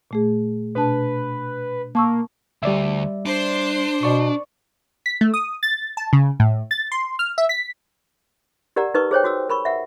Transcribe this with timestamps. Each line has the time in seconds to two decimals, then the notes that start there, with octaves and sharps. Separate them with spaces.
0.11 A#2 A3 G#4
0.75 B2 D4 B4 A5
1.95 A#3 A5 C#6 E6
2.63 D2 G3 D5 E5
3.26 D4 C5 C6
4.03 B2 D5 C#6
5.06 B6
5.21 A3
5.34 D#6
5.63 A6
5.97 A5
6.13 C#3
6.40 A2
6.71 A6
6.92 C6
7.19 F6
7.38 E5
7.49 B6
8.76 G4 A#4 D5 F#5 A#5
8.94 D#4 A#4 B4 C#6 D#6
9.11 G#4 C5 C#5 G5
9.24 F#4 D#6 E6
9.49 A#4 B5 C#6
9.65 E5 F#5